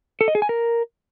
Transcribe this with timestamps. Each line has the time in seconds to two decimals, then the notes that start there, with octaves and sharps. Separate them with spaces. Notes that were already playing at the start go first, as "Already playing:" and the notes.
0.21 A4
0.28 D#5
0.35 G#4
0.42 G#5
0.49 A#4